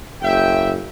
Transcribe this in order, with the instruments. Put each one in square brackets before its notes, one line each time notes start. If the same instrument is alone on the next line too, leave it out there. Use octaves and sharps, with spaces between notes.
[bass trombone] F#1 [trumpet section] E5 G5